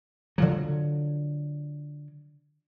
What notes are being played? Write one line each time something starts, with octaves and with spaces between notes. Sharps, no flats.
D3 F3 F#3